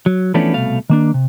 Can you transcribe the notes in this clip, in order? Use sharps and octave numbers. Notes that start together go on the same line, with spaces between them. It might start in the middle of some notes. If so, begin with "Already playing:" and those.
F#3
E3 F3 A3 B3 C#4 D4
C2 B2 A3 F5
D#3 A#3 D4
C3